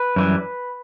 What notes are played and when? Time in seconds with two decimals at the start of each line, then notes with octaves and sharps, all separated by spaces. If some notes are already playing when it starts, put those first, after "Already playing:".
Already playing: B4
0.16 F#2 E3 G3